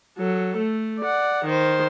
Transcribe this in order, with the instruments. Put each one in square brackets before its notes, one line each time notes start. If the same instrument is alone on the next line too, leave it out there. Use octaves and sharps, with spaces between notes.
[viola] F#3 A4
A3
D5 F#5
D#3 C5